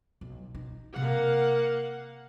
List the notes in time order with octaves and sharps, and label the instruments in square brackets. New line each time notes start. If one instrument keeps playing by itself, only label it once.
[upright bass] B1
D#4
[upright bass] C3 [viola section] A#3 F5 F#5